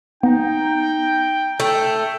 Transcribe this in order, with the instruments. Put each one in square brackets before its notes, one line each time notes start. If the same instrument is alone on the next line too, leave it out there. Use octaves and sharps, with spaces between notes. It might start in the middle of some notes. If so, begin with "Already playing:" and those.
[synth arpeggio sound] B3 [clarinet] D#4 [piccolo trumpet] G5
[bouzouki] A3 [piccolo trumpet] G5